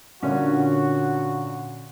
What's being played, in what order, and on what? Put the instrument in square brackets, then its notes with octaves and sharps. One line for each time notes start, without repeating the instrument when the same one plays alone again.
[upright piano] A#2 D3 [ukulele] C#4 [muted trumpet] F#4